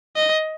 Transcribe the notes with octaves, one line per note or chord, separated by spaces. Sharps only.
D#5